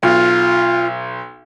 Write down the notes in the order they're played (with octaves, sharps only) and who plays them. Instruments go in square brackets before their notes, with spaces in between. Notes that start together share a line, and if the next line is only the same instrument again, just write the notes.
[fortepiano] B1 [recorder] F4